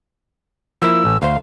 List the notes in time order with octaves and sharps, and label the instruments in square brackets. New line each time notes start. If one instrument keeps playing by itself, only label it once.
[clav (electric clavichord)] F3 A#3 E4 [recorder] E6
[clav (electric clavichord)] A1
[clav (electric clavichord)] D2 C5 [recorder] F5